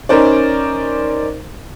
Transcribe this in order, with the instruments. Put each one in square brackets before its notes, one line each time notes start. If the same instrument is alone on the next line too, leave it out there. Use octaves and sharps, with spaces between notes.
[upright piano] C#4 D#4 A#4 C5 D5